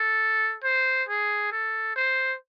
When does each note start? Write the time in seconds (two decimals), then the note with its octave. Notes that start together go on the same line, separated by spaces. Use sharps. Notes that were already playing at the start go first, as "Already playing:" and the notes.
Already playing: A4
0.64 C5
1.09 G#4
1.52 A4
1.96 C5